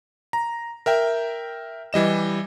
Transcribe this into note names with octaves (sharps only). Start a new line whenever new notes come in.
A#5
A#4 E5 G5
E3 G3 D#5 E7